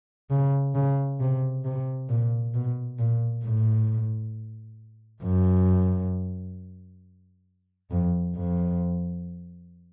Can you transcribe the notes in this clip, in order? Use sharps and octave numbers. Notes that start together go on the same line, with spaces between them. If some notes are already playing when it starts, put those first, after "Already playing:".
C#3
C#3
C3
C3
A#2
B2
A#2
A2
F#2
F2
F2